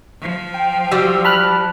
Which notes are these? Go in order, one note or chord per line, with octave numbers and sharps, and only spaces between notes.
F3
G5
G3 F#4 G4 E6
A5 B5 F6 F#6